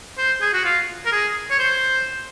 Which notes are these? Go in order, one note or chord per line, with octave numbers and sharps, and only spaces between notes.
C5
G#4
F#4
F4
A#4
G#4
C#5
C5